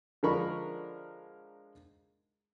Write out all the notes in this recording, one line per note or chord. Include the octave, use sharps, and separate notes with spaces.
D3 F3 G#3 A#4 B5 C#6